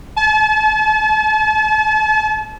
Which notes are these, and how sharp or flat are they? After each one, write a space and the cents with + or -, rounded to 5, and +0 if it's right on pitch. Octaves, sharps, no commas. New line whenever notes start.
A5 -40